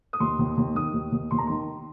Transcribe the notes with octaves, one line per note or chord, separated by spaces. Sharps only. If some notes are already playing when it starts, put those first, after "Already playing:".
D#6
D#2 C6
D#2
D#2
D#3 D#6
D#2
D#2
D#2 C6
A#5
D#3 C6